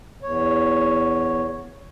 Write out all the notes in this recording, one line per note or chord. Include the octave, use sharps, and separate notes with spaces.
E2 C#5